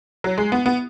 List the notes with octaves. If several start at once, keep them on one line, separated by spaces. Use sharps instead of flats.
F#3
G#3
B3
B3